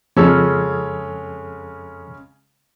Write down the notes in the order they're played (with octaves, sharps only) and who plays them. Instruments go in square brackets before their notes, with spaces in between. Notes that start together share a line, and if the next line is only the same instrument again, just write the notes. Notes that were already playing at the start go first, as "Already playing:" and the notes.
[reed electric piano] F2 A4 E6 [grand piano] C#3 G#3 C#4